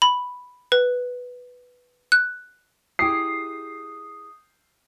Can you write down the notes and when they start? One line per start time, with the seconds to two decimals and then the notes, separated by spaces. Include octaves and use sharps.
0.02 B5
0.72 B4
2.12 F#6
2.99 E4 G4 G#4 D#6 C7